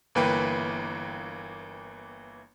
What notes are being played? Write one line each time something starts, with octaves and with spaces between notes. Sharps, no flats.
G1 E3 A#3 B4 G5